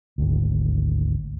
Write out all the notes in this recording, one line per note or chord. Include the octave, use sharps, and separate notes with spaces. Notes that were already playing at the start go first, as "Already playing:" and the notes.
G#1 D2